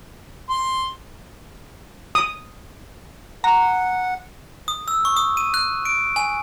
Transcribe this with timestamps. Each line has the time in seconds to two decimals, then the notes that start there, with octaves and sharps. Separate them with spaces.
0.50 C6
2.15 D#6
3.44 F#5 A#5
4.68 D#6
4.88 E6
5.05 C#6
5.17 D#6
5.37 D#7
5.54 F#6
5.85 D7
6.16 G#5